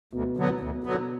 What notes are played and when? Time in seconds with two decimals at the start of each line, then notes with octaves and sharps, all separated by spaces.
0.13 D2 B2
0.37 D3 F#3 B3
0.61 D2 B2
0.84 D3 F#3 B3